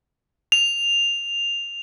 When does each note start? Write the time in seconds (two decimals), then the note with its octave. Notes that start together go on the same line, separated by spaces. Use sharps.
0.52 F7